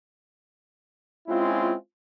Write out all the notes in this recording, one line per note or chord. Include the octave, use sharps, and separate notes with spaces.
G#3 C4 C#4 E4 F4